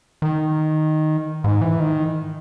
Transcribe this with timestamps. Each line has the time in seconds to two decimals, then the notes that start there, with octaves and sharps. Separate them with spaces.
0.22 D#3
1.44 G#2
1.61 E3
1.80 D#3